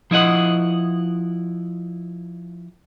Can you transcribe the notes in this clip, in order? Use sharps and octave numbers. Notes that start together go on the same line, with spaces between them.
F3 E4 D#5 F#5